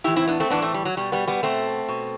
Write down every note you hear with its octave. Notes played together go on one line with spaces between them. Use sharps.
A2 E3 E4 G4
C4 E4
B3 D4
A3 C4
A2 E3 B3 D4
A3 C4
G3
F#3
B2 G3
G3 B3
G3 B3
B2 A3 C4
B2